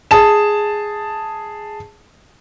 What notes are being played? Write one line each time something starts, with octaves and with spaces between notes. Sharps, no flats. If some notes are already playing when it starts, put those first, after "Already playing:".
G#4 A5 E7